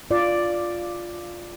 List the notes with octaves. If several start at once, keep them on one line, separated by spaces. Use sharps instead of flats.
F4 D5